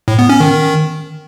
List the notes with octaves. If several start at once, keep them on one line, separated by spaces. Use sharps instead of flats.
A2
B3
C#4
D#3